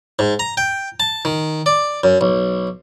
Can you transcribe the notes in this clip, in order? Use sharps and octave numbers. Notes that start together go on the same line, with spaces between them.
G#2
A#5
G5
A5
D#3
D5
F#2
B1